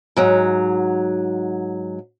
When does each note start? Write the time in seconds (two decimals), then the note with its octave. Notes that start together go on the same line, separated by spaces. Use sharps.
0.17 G#2 F#3